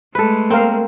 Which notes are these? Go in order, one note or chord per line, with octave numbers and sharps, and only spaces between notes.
G#3 A3 A4 B4
A#3 C4 A#4 F5